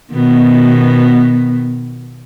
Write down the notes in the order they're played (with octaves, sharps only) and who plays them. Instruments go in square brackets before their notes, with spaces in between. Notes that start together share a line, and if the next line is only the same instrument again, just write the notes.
[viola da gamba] B2 D#3 B3